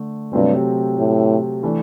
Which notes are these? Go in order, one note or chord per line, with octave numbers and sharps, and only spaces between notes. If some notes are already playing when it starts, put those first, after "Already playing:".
Already playing: D3 A3
G2 C3 F#3 A3 C4
A2
E3 A3 D4